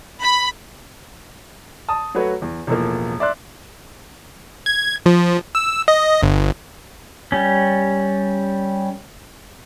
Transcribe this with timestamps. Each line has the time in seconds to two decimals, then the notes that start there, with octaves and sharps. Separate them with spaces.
0.21 B5
1.88 A5 D#6
2.15 F#3 A3 F#4 B4 C#5
2.42 E2
2.67 E1 A2 F3 A#3
3.20 D5 E5 C6 F#6
4.66 G#6
5.06 F3
5.55 E6
5.88 D#5
6.22 G1
7.32 G3 C#4